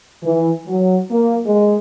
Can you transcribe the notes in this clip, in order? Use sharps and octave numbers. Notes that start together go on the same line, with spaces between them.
E3
F#3
A#3
G#3